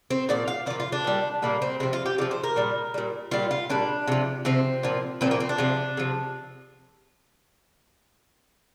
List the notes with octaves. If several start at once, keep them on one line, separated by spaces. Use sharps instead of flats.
C4
A#2 F3 D5
F5
A#2 F3 D5
F4
D4
A#2 G3
A#2 G3 A#3
C4
C3 F3 C4
F4
G4
C3 F3 D5
C5
A#4
A#2 G3
A#2 G3
A#2 G3 F4
F4
A#2 G3 D4
C3 F3
C3 F3 C4
A#2 F3
A#2 F3 C4
A#3
C4
D4
C3 F3
C3 F3